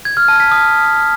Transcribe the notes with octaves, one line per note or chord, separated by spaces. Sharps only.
G#6
F6
A5
B6
D#6